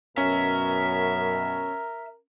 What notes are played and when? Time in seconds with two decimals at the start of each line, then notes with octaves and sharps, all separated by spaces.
0.18 F#2 B2 C#4 A#4 E5